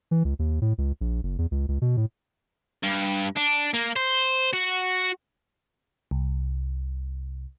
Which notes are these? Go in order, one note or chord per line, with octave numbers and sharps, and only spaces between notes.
E3
C#2
D#2
A2
C#2
A#1
F#1
E2
C#2
C#2
B2
A2
G2
D4
A#3
C5
F#4
C2